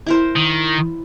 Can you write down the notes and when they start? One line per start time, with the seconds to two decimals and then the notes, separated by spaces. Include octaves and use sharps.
0.06 E4 A#4 C5
0.36 D#3